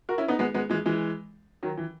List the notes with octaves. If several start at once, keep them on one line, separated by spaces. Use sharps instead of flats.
F#4 A#4
C#4 E4
B3 D#4
G#3 B3
G#3 B3
E3 G#3
E3 G#3
D#3 F#3
E3